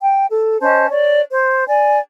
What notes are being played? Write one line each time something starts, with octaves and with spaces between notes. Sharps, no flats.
G5
A4
C#4 C5 D#5 A5
C#5 D5
C5
D5 G#5